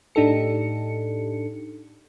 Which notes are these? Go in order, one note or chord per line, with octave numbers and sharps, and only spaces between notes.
A2 D4 D#4 G4 A4 C#7